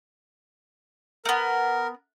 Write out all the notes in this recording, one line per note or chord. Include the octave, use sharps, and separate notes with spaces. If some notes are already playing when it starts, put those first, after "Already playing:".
A3 B3 A#4